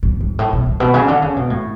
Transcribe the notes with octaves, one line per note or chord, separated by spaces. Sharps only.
A2
G#2
A2
B2
A2
B2
C#3
D3
C#3
B2
A2